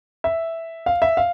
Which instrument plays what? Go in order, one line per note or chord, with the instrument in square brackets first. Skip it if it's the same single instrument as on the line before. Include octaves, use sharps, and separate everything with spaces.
[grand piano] E5
F5
E5
F5